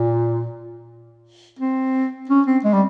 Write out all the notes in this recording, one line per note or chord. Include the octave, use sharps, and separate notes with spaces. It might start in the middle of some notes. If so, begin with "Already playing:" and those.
Already playing: A#2
C4
C#4
C4
G#3
G3